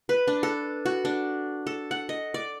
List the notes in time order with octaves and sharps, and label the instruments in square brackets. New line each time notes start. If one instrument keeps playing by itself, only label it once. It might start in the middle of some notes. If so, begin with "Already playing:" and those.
[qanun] B4
D4
A4
F#4
D4
A4
F#5
D#5
D5